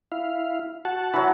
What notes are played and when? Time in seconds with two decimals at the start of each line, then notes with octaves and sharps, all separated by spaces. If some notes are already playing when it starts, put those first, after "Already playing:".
0.12 E4 F5
0.85 F#4 F#5 A5
1.13 E3 F#3